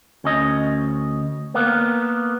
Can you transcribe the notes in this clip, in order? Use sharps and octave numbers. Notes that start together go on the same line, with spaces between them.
D2 C#4 D#5
A#3 B3